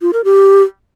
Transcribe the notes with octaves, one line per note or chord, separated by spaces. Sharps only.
F4
A#4
G4